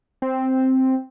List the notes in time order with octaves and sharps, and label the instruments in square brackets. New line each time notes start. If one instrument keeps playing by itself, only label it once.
[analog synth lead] C4